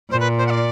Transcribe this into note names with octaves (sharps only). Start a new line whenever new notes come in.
A#2 C5
B4
C5
F#5
D5